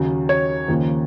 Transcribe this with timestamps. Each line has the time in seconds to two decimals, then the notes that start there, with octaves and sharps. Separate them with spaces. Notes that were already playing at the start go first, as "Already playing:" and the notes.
Already playing: D#2 C#3 F#3
0.29 C#5
0.68 D#2 C#3 F3 A#3